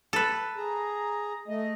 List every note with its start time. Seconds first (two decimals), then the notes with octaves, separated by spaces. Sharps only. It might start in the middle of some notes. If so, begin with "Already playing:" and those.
0.13 A4 B4
0.57 G#4 A#5
1.48 A3 D#5